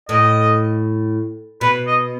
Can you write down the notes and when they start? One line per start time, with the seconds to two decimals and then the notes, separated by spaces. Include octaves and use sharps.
0.09 A2 D#5
1.61 B2 B4
1.87 D#5